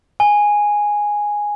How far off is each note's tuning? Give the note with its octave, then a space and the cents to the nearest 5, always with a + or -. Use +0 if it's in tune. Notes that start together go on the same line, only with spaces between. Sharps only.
G#5 -5